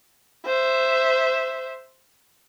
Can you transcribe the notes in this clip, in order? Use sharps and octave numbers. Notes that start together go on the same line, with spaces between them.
C5 E5